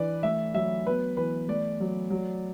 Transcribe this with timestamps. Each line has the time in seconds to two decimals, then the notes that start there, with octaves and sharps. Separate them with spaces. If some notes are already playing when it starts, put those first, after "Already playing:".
Already playing: E3 D4 B4 D5
0.23 A3 E5
0.54 F#3 E5
0.87 B3 B4
1.17 E3 B4
1.48 A3 D5
1.80 F#3
2.10 F#3